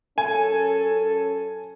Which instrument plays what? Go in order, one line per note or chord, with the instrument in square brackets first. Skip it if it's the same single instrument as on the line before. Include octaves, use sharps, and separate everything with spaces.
[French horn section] F#2 C#4 A4 [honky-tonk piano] G#5